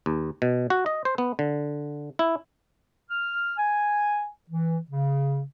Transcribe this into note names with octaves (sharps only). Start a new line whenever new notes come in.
D#2
B2
F#4
D#5
C5
B3
D3
E4
F6
G#5
E3
C#3